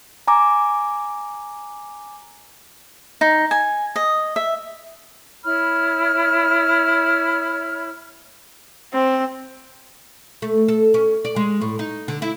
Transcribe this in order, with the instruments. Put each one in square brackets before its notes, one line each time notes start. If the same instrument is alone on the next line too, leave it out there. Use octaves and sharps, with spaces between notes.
[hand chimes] G#5 A#5 D6
[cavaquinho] D#4
G#5
D#5
E5
[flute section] E4 C#5 B5 F6
[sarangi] C4
[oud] A3
A4
C#4
D5
G#3
A2
D#4
D3
E4